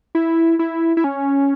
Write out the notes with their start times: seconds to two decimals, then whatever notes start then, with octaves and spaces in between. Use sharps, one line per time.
0.15 E4
0.59 E4
0.97 E4
1.04 C#4